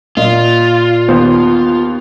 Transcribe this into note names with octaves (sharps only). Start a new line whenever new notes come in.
A#2 F4 D#5
D#2 B3 C5